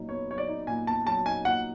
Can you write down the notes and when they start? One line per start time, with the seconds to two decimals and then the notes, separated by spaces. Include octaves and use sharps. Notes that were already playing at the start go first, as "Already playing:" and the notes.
Already playing: A#2 F#3 D#4
0.09 B3 C#5
0.28 F#3 C#5
0.38 D5
0.48 D#4
0.67 A#2 G#5
0.87 B3 A5
1.06 F#3 A5
1.25 D#4 G#5
1.45 A#2 F#5